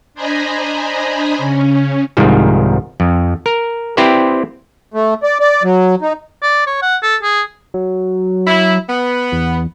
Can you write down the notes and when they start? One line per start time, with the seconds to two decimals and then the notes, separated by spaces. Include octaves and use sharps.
0.14 D4 C5 D#5 G#5 A#5 B5
1.38 C#3 C#4
2.17 C2 G#2 D#3 F3 G3
3.00 F2
3.46 A#4
3.97 C4 E4 G4 B4 C5 D5
4.94 A3
5.23 D5
5.40 D5
5.63 F#3
6.02 D#4
6.43 D5
6.67 C#5
6.82 F#5
7.03 A4
7.23 G#4
7.74 F#3
8.47 E4
8.89 B3
9.32 E2